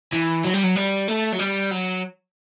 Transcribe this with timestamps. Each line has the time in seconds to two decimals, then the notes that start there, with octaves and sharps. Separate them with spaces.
0.12 E3
0.45 F#3
0.54 G3
0.64 F#3
0.76 G3
1.08 A3
1.32 F#3
1.39 G3
1.71 F#3